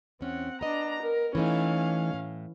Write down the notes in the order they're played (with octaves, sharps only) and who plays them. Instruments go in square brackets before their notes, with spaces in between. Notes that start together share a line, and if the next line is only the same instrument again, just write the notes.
[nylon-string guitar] E2 C#4 [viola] C4 F#5
[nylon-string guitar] B3 D#5 [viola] D4 A#5
[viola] A#4
[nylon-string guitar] E3 A3 D#4 [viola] C#4 F5
[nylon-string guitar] A2